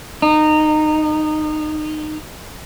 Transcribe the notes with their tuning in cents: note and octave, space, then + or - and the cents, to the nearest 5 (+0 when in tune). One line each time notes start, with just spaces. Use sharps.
D#4 -20